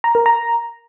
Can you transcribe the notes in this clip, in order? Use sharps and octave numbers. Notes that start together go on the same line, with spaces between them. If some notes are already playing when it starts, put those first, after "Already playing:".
A#5
A#4
A#5